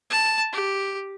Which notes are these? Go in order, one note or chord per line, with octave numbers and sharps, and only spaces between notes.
A5
G4